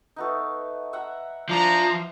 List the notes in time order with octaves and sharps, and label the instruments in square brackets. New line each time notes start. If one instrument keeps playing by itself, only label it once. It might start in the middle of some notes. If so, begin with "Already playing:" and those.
[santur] A3 B3 D#4
E5 F#5 A#5
[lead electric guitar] F3 [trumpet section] D4 A#5 [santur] E4